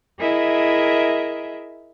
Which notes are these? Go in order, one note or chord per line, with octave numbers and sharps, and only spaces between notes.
E4 G#4 A#4 D#5 E5